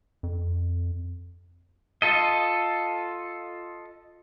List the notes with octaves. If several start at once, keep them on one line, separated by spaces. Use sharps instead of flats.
F2
F4 A4 D#5